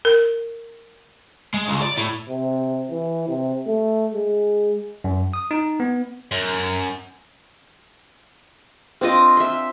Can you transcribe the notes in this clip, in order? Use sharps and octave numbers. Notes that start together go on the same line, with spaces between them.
A#4
G#3
C#2
D5
A2
C3
E3
C3
A3
G#3
F#2
D#6
D#4
B3
F#2
C4 D4 F4 D#5
E5 C6